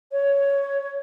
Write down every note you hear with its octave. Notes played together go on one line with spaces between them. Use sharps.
C#5